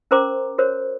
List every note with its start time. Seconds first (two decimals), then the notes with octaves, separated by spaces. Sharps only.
0.11 C#4 A#4 C5 A#5 C6 D6
0.58 F#4 A#4 C5 C#5